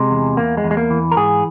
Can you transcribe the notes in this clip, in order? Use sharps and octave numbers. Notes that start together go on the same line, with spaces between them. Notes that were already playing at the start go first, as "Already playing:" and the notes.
Already playing: C3 G#3
E2
E2 A#3
G#3
E2
G#3
A#3
E3
A#4
G#2 G#4